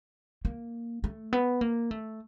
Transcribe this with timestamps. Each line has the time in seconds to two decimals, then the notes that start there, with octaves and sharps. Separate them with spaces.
0.45 A#3
1.04 A3
1.33 B3
1.61 A#3
1.91 A3